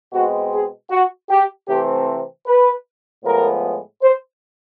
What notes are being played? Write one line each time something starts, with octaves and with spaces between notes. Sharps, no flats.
B2 G#3 C4 F#4
G#4
F#4
G4
C3 E3 A3 C4 G4
B4
A2 F3 G#3 B3 A#4
C5